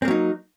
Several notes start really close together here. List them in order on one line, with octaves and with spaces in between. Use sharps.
C4 A#3 F#3 D#4